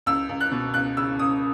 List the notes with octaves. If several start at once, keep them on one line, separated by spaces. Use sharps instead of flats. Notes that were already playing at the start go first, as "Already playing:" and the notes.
C#2 E6
C#2
F#6
B2
C#2 F#6
C#3 E6
C#2 D#6